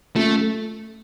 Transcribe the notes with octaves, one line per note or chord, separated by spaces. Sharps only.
A3 A#3 C#4 F4
A3